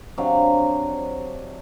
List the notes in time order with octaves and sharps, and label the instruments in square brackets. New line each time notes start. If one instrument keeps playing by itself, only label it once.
[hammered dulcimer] C3 F#3 D4 F5